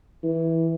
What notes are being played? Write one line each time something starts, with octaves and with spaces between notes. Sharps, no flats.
E3